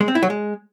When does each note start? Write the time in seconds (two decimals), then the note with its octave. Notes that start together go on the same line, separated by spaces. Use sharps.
0.01 G#3
0.08 C4
0.15 E4
0.23 F#3
0.30 G#3